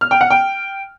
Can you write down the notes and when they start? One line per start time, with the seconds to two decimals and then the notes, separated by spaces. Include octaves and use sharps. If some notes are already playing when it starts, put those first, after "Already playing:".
0.01 F6
0.11 G5
0.21 F#5
0.30 G5